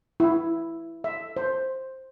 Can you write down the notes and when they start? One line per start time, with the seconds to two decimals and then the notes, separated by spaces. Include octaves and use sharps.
0.20 E4
1.04 E5
1.37 C5